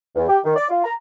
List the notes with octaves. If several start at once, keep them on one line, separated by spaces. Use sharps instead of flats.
E2
G4
D#3
D5
F4
A#5